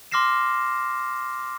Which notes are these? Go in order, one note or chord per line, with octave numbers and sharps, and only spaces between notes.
C6 D6 F6 A#6 C7 E7